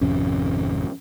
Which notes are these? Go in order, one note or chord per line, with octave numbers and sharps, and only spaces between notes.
G#1 F2 C3 C#4